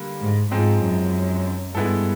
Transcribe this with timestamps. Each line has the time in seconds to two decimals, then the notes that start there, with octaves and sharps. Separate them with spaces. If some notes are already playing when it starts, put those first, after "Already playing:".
Already playing: D3 G3 A#3
0.20 G#2
0.51 G#2 F3 G#3 C4 D#4
0.82 F#2
1.75 G2 G#3 B3 E4 A4